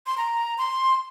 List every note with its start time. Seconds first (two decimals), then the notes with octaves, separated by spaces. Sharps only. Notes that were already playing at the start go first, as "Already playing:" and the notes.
0.06 C6
0.18 A#5
0.58 C6